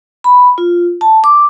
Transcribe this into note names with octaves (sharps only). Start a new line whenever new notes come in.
B5
F4
A5
D6